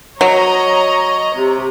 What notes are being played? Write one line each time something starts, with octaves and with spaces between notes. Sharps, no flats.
F#3 C#5 D#5 A#5
C3